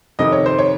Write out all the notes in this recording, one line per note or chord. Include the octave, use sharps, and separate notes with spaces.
F2 C3 D#3 D#5
C#5
C5
C#5